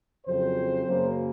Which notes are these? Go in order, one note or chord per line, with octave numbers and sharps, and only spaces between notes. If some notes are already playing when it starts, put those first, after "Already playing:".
F2 C#3 F#3 C4 C5
F#2 C#3 F#3 A#3